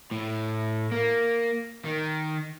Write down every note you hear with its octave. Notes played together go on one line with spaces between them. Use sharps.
A2
A#3
D#3